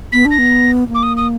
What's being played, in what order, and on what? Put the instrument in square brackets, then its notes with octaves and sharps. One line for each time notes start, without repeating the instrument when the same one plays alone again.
[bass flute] B3 [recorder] B6
[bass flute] D4
[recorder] A#6
[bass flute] B3
A#3
[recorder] D6
D#6
D#6